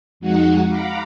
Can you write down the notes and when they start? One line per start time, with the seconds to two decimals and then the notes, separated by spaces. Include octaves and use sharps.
0.20 F2 G#3 D#4 F#4 F#5
0.67 F5 F#5 A#5 B5 D6